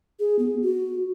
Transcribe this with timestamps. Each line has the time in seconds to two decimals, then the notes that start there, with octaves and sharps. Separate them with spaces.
0.20 G#4
0.39 B3
0.63 F#4